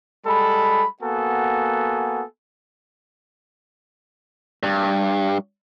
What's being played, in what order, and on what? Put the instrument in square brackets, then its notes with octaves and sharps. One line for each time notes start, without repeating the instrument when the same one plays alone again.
[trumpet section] G3 G#3 A4 B5
A#3 B3 F#4 A4 G#5
[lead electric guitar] G2